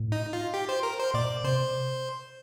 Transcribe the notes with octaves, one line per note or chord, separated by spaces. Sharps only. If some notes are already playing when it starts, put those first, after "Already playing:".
Already playing: A2
D#4
F4
G4
C5
A#4
C5
A#2 D5
C3 C5